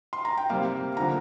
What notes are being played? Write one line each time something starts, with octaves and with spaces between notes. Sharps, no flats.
C6
A#5
G5
C3 G3 A#3 F5
D3 F3 A#3 A#5